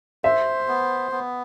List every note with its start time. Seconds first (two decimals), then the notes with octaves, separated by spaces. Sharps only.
0.24 C5 E5
0.68 B3
1.12 B3